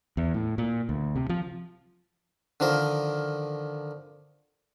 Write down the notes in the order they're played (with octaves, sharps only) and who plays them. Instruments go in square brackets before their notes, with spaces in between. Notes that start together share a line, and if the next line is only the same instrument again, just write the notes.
[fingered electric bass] E2
A2
A#2
D2
C3
F3
[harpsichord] D3 D#3 F3 A#4